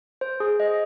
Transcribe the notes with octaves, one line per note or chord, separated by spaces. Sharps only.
C5
G#4
D#5